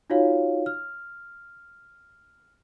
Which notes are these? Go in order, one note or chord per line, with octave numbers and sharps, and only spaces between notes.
D#4 F4 F#4 C#5 F5
F6